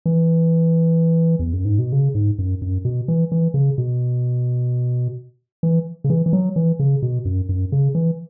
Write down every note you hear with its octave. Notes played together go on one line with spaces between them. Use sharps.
E3
E2
F#2
G#2
B2
C#3
G#2
F#2
F#2
B2
E3
E3
C#3
B2
E3
C#3
E3
E3
F#3
E3
C#3
B2
F#2
F#2
C#3
E3